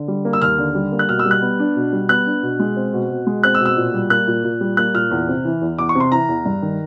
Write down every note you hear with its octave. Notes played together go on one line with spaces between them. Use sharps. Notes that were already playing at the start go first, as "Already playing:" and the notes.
Already playing: D3
G3
A#3
E6
D#2 F6
D3
G3
A#3
F#6
B2 F6
E6
G3
F#6
B3
D4
B2
G3
B3 F#6
D4
B2
G#3
C4
B2
B2
G#3
C4 F#6
E6
B2
E6
A#2
G3
A#3 F#6
A#2
A#2
G3
A#3 F#6
A#2 F6
E2
C3
E3
E2
E2 D6
C#6
C3
C6
E3 A#5
E2
G2
D#3